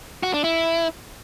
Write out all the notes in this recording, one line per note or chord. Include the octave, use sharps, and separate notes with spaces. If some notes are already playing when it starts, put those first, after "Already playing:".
F#4
D4
E4